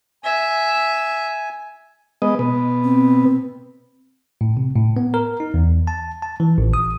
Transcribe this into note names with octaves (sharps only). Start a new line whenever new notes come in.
E5 G#5
G#3 B3 D#5
B2 B3
C4
A2
C3
A2
B3
A#4
D#4
E2
A5
A5
E3
A1
D#6